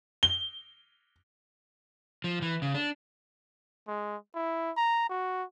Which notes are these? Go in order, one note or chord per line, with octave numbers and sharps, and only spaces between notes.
G7
F3
E3
C#3
D4
G#3
E4
A#5
F#4